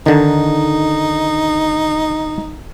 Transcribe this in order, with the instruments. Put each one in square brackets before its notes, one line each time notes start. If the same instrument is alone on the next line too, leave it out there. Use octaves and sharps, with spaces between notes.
[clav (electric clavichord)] D3 D#3 [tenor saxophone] D#4